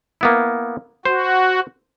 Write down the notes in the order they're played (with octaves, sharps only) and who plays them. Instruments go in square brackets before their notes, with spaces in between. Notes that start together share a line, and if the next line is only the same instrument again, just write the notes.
[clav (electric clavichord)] A#3 B3 E4
[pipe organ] F#4 [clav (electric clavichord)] C5